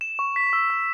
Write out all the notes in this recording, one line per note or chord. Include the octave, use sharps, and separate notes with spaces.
E7
C#6
B6
E6
E6